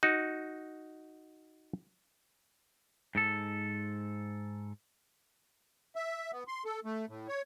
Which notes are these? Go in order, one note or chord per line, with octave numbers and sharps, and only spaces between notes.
D#4 F#4
G#2 A4
E5
B3
C6
A4
A3
A2
C#5